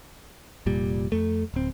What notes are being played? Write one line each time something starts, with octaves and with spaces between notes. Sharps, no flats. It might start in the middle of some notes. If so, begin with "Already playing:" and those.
F1 A#2 G3
F2 A3
D1 C4